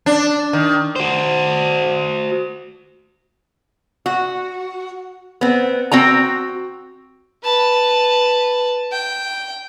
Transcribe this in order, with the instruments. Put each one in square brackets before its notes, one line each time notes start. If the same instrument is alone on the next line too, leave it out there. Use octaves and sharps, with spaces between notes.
[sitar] D4
D#3
[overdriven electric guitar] F#4 C5
[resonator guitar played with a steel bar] F#4
B3 C4
C4 F#4 G5 A#5
[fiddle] B4 A5
G5